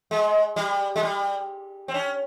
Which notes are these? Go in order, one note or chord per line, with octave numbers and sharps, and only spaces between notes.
G#3
G3
G#3
G3
C4
C#4